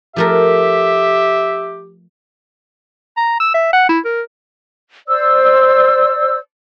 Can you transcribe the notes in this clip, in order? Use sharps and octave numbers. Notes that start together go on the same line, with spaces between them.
F3 A3 G4 A#4 E5
A#5
E6
E5
F#5
E4
A#4
C5 D5 E6